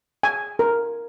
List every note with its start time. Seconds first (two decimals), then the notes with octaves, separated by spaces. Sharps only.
0.23 G#5
0.59 A#4